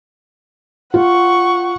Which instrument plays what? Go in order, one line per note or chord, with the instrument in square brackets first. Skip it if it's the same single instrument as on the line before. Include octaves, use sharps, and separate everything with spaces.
[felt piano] F4 [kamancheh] F#5 C#6